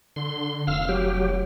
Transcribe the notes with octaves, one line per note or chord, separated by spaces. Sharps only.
D3 C6
F1 F5 E6 F6
F#3 G4